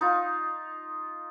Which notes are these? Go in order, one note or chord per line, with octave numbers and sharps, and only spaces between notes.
D#4 F4